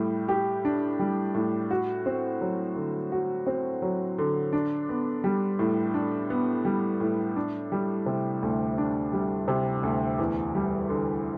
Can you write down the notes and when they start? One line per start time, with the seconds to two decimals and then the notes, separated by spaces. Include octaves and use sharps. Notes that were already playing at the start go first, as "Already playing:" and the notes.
Already playing: A2 G3
0.28 G4
0.65 D4
0.99 G3
1.34 A2
1.71 F#4
2.06 C4
2.41 F#3
2.76 D3
3.12 F#4
3.47 C4
3.82 F#3
4.18 D3
4.53 D4
4.89 B3
5.24 G3
5.59 A2
5.94 D4
6.30 B3
6.65 G3
7.00 A2
7.36 D4
7.72 G3
8.06 C3
8.43 D2
8.78 D4
9.13 G3
9.48 C3
9.83 D2
10.18 E2
10.55 G3
10.89 D3